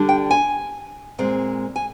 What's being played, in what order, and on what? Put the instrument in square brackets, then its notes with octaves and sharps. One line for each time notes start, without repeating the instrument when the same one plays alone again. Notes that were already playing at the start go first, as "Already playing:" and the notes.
Already playing: [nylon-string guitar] D3 G3 D4
G5
G#5
A#2 G#3 C4
G#5